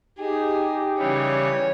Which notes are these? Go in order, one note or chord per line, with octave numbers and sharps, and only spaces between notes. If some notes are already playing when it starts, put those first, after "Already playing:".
D#4 G4 G#4 G5
C#3 E3 G3 C#5